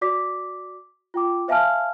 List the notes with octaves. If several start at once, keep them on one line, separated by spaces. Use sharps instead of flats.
F#4 D5 D6 B6
F4 G5 D6
C5 E5 F5 G#5 A5 F6